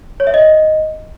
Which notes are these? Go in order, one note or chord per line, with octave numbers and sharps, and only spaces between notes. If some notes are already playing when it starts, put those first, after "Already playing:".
C#5
E5
D#5